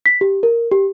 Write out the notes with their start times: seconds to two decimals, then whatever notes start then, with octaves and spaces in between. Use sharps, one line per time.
0.06 B6
0.21 G4
0.43 A#4
0.72 G4